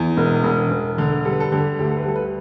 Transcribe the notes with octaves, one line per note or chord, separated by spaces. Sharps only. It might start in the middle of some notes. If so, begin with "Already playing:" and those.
Already playing: E2
E1
E1
E1
D3
G3 A4
B4
A4
D3 G4
D2 G4
A4
B4
G3 A4
B4